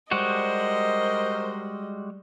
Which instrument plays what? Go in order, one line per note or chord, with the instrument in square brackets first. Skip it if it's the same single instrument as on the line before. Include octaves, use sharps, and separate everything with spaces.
[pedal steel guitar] G3 G#3 F#4 [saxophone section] A#4 C5 [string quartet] D#5